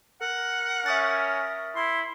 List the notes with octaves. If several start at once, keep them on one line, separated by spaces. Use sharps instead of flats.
A#4 F#5
C#4 E5 D#6 A6
E4 C6